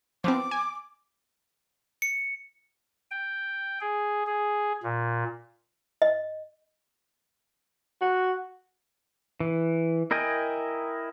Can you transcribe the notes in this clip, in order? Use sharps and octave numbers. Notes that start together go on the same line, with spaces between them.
F3 B3 C4 D6
G#5
C#7
G5
G#4
G#4
A#2
D#5
F#4
E3
E4 A#4 D#5 G5 G#5